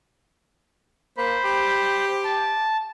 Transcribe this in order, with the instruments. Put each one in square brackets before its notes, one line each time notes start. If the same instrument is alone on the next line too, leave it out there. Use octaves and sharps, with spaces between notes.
[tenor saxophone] A#3 [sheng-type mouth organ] C5 B5
[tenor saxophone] G4
[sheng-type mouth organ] A5